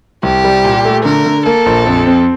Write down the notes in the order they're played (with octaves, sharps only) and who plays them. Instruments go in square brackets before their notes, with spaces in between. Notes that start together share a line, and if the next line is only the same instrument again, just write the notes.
[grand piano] C2 [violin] G4
[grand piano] G3
A#2
A3
[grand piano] D3 [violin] A#4
[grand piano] D3
[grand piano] A#3 [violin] A4
[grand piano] A#1
F2
C4